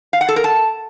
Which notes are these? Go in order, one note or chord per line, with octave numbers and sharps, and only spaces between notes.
F5
F#5
A4
A#4
A5